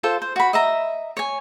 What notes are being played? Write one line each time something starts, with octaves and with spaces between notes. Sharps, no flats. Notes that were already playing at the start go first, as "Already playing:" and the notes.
F4 A4 C5
C5
F#4 B5
D#5 E5 A#5
C#5 G#5